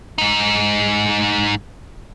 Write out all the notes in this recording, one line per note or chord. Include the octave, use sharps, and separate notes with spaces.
G#2 D#4